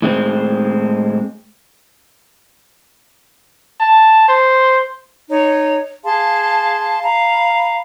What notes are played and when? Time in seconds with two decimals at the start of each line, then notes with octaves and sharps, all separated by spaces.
0.02 A2 G#3 C4
3.80 A5
4.28 C5
5.29 D#4 C#5
6.05 G#4 F5 A5 C6
7.03 F5 A#5 B5